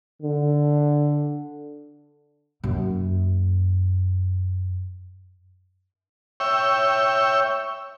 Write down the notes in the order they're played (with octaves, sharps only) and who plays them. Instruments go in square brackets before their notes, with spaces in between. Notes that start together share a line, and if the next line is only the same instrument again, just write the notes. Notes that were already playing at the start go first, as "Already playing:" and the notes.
[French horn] D3
[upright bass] F#2 A#3
[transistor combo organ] C#5 E5 G5